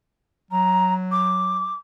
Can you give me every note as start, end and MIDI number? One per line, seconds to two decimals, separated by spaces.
0.51 1.73 54
0.51 0.93 82
1.11 1.75 86